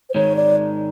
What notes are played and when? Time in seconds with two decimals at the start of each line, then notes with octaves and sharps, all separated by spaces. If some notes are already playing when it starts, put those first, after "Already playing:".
0.10 C5
0.15 G#2 D#3 G#3 C#5
0.36 D5